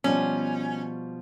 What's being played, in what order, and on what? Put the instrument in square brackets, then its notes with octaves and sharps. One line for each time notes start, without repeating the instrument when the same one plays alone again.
[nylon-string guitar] B2 F3 G3 [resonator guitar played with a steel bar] C#4